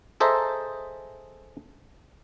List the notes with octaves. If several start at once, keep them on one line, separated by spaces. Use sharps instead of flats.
G#4 A4 C5 D#5 E5 A#5